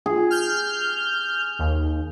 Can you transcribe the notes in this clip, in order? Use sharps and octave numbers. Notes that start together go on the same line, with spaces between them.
G#4
F6 G6
D#2